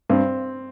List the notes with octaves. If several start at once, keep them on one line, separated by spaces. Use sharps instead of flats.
G2 C4